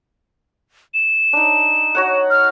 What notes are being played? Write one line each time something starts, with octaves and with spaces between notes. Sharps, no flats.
E7
D4 D#4
F#4 C#5 F#5
F6